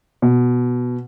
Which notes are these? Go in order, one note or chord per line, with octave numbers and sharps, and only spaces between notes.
B2